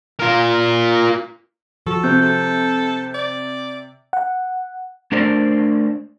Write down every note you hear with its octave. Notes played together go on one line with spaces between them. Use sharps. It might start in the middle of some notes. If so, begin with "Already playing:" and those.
F4 A#4
F3 F#4 A4 E6
C3 C5 F#6 G6
A4
D5
F#5
A3 D4 A#4 C5 D5